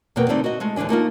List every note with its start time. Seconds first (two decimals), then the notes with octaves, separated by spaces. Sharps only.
0.16 E2 B2 A#3 B3 G5
0.29 D3 G3 A3 C4 D#4 D5
0.44 F#4 D#5
0.60 G#3 A3
0.76 D#2 D3 E3 D4 G#5
0.89 A3 A#3 D#4 F4